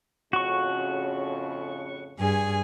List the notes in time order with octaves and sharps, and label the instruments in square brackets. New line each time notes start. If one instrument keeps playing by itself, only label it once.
[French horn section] F2 A2 C#3 [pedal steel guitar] F#4 C#6
[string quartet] G2 G#4 G#5